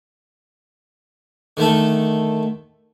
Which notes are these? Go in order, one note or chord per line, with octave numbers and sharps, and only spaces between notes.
D3 D#3 A3 A4